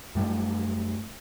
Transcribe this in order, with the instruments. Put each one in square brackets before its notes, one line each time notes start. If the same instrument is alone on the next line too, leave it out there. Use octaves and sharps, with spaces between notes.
[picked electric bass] F#2 G3 A3